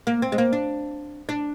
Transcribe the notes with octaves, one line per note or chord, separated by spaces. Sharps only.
A#3
C4
G#3
A#3
D4
D4